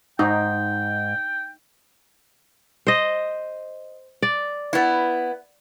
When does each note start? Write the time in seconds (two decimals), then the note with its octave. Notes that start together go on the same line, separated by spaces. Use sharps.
0.19 G#2 D#4 G5
2.87 C5 D#5
4.22 D5
4.73 B3 E4